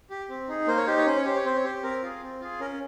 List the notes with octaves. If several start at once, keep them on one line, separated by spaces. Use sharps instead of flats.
G4
C4
D#4 G#4
A#3 C5
C#5
D#4 G4 C5
C#5
C#4 C5
C#5
G4 C5
C#5
C4 C5
C#5
G4 C5
C4 A#4
F4 G#4
C4
F4 G#4
C#4 A#4